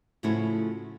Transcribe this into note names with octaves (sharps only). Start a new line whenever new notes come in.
A2 C#3 F3 A3 E4 F#4